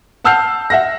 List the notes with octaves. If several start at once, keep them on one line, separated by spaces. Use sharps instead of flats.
F#5 A5 E6 F6 G6 C7
E5 F#5 A#6